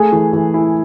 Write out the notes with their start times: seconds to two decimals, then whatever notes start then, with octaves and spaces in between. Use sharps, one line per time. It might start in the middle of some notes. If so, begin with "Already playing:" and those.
Already playing: A3 G#4
0.12 E3
0.33 E3
0.54 E4